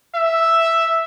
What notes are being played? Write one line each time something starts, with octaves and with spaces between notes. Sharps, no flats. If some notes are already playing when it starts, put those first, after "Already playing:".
E5